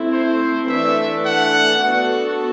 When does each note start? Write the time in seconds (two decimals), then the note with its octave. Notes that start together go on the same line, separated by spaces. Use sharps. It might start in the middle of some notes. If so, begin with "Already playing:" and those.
Already playing: A3 C4 E4
0.13 C5
0.69 E3 A3 D4 A4 E5
1.25 F#5
1.81 B3 D4 F#4 A4 F#5